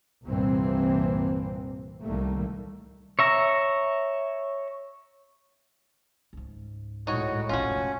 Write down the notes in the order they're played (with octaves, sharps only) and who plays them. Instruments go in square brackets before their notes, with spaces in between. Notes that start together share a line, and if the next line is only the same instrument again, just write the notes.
[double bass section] C2 G2 A#2 E3 A#3 C4
C2 A2 D#3 G3 A3 A#3
[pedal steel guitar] C#5 E5 A#5
[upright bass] C#2 G#2
[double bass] A2 G#3 [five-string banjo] D#4 C#5 [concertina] F#4
[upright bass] F1 A#1 [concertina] C#4 [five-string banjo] F4 F#4